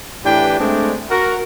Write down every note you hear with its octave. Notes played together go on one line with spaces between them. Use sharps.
A2 E3 D4 G4 B4 G5
G#3 A3 C4 D4
F#4 A#4